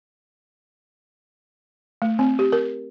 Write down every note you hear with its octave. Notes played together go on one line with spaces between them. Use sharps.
A3
C4
G4
A#4